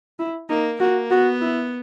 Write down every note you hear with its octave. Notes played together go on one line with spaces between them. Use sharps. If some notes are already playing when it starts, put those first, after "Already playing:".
E4
A#3 D#4
A#3 F#4
B3 F#4
E4